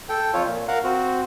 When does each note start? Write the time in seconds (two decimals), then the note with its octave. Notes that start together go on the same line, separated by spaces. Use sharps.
0.09 A4 G5
0.34 F2 F4 C#5
0.46 A#2
0.68 A#4 F5 F#5
0.84 C4 F#4